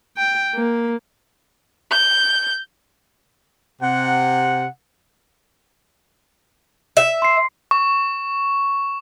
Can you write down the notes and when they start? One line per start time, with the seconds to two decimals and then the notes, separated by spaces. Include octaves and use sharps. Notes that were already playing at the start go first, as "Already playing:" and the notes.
0.17 G5
0.54 A#3
1.91 G6
3.82 C3 F#5
6.97 E5
7.22 C6 C7
7.71 C#6